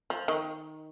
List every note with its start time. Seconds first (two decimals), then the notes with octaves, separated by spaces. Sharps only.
0.10 F3
0.28 D#3